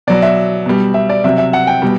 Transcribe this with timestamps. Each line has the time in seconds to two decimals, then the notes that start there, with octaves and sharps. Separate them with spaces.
0.07 B2 F#3 D5
0.22 E5
0.66 B2 G3
0.94 E5
1.09 D5
1.24 C3 F#3 E5
1.38 E5
1.53 F#5
1.67 G5
1.82 B2 G3